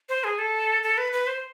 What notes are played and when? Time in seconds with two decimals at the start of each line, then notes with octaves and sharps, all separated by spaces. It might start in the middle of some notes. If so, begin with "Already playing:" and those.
0.09 C5
0.24 G#4
0.39 A4
0.83 A4
0.98 B4
1.13 B4
1.27 C5